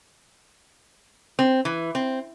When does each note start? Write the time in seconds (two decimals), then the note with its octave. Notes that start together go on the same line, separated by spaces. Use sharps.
1.39 C4
1.65 E3
1.95 C4